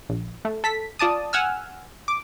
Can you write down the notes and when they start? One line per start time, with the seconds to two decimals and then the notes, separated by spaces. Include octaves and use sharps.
0.09 A#1
0.45 A3
0.64 A4 B6
0.99 F4 D5 A5 D#6
1.33 F#5 G#5 E6 F6
2.08 D6